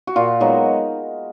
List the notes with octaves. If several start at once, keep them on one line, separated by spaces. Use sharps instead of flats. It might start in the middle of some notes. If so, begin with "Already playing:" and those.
F#4
A#2 F4
F#3 G#3 B3 D#4 F#4